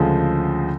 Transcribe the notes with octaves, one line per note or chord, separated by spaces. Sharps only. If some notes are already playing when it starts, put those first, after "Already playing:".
Already playing: D2 C#3 F3 G#3